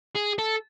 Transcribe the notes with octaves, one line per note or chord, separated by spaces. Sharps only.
G#4
A4